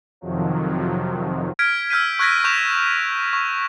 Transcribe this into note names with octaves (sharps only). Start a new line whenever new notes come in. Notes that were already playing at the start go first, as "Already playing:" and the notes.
F2 C3 D#3 F3 F#3
F6 G#6 B6 D7
E6 F6 G6 B6 D#7
C#6 F#6 G#6 A#6 B6
C#6 G6 E7 F7
C#6